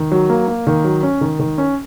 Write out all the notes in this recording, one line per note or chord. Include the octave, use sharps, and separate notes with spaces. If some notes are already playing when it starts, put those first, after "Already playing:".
Already playing: D#3
F#3
A#3
A#3
D#3
F#3
C#4
D#3
D#3
C#4